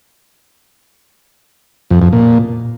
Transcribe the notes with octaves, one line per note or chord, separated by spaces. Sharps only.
F2
F2
A#2